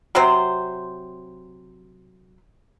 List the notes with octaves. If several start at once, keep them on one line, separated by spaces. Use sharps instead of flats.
C3 F#3 C4 C5